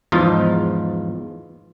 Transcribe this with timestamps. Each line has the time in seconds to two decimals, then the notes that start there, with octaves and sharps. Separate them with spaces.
0.12 E2 G#2 F3 D#4 F4